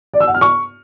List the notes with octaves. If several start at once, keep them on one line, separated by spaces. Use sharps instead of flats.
D5
E6
F#5
F6
C#6